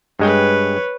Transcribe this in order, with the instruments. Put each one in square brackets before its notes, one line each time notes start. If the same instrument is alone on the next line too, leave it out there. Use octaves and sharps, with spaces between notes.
[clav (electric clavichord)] G2 G#3 G5 [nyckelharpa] B4 C#5